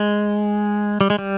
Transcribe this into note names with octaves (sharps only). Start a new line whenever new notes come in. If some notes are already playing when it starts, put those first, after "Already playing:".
Already playing: G#3
G3
G#3
G3